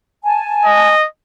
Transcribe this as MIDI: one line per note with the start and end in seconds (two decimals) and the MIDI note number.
0.24 0.91 80
0.24 0.91 81
0.65 1.07 75